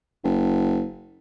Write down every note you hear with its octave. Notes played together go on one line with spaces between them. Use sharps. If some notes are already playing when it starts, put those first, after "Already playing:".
F#1